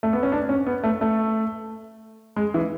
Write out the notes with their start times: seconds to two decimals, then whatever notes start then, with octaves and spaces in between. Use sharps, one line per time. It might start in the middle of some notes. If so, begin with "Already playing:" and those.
0.03 A3
0.13 B3
0.23 C#4
0.32 D4
0.49 C#4
0.66 B3
0.84 A3
1.01 A3
2.36 G#3
2.54 E3